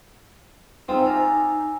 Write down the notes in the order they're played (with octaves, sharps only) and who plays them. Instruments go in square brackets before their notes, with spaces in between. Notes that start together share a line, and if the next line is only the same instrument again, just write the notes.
[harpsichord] C4 F4 [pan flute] D#4 [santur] G#4 E5
[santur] D5 G#5 A#5 [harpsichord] F5